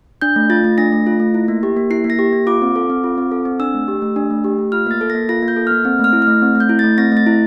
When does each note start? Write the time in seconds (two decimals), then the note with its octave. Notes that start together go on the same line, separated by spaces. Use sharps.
0.22 D4 G6
0.36 A3
0.50 F4 A6
0.64 A3
0.78 D4 A#6
0.93 A3
1.07 F4
1.20 A3
1.34 E4
1.48 A#3
1.63 G4
1.77 A#3
1.90 E4 C7
2.04 A#3
2.10 A#6
2.19 G4
2.33 A#3
2.47 F4 D6
2.62 C4
2.76 A4
2.90 C4
3.04 F4
3.18 C4
3.31 A4
3.45 C4
3.60 D4 E6
3.74 A3
3.88 G4
4.02 A3
4.16 D4
4.30 A3
4.44 G4
4.58 A3
4.72 F4 F6
4.86 A#3 A6
5.01 A4
5.10 A#3 A#6
5.29 F4 A#6
5.42 A#3
5.48 G6
5.56 A4
5.67 A#3 F6
5.85 C4
5.99 A3 F6
6.13 E4
6.22 A3 F6
6.42 C4
6.55 A3
6.60 G6
6.69 E4
6.79 A3 A6
6.98 C4 A#6
7.12 A3 A6
7.27 E4